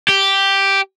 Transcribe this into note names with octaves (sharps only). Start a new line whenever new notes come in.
G4